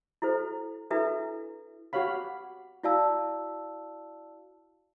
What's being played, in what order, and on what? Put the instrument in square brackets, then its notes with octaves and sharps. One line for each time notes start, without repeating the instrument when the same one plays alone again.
[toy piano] E4 F#4 A4 C5
D4 E4 F#4 A4 B4 E5
[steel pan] F#4 G4 C#5 F5 B5
[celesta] E4 F#4 D5 F5 A5 E6